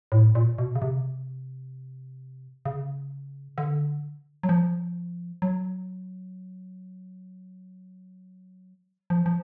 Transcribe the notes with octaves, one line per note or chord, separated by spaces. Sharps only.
A2
A#2
B2
C#3
C3
C#3
D3
F#3
F3
F#3
F3
F3